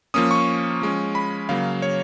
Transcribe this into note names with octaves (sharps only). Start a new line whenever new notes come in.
F3 A#3 C#4 D#6
C#6
F3 G#3 C#4
B5
C#3 F#3 A#3 F5
C#5